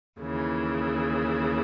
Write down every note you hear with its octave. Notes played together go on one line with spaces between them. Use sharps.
D#2 C#3 E3